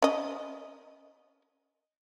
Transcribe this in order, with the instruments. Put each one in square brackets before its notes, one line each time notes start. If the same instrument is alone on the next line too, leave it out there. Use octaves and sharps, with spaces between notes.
[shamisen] C#4 D#5